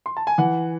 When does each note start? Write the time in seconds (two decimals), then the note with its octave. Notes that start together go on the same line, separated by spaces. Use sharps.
0.06 C6
0.17 A5
0.27 G#5
0.38 E3 F#5